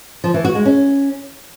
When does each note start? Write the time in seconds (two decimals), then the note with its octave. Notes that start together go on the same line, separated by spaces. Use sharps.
0.24 F3
0.34 E3
0.45 F#4
0.55 G#3
0.65 C#4